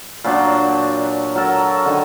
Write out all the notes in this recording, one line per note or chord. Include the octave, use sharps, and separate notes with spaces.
A#2 F#3 D4 G5
F#3 A4 A#4 A5
D3 D#3